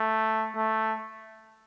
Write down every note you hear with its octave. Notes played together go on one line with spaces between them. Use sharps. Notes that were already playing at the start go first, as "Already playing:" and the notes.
Already playing: A3
A3